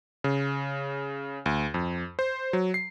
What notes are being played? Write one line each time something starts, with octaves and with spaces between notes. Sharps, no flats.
C#3
D2
F2
C5
F#3
C7